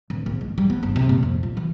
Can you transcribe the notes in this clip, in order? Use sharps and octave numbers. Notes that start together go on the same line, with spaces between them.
D1
A#1
G#2
G3
B3
G1
C3
A#2
F2
F4
E3